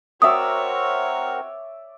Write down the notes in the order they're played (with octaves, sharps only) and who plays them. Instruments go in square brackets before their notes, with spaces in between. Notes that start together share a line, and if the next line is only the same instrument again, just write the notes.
[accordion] C4 F#4 A#4 [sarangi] C#5 [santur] D5 E5 E6 [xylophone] D#6